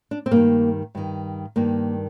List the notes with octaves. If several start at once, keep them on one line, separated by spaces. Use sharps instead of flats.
D4
C4
G2 D#3 A#3
G2 D#3
G2 D#3 A#3